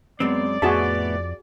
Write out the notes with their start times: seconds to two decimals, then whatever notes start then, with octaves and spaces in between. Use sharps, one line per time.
0.20 F#2 G#3 B3 C4 D5
0.62 F2 A2 B3 F#4 G#4 E5 A5